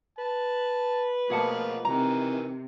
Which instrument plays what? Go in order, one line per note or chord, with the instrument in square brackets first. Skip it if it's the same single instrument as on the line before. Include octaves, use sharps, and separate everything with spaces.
[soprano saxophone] B4 [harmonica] A5
[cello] B2 A3 [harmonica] F3 A#3 [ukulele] G#4 F#5 A5
[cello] C3 [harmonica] D#3 E3 [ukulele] A#5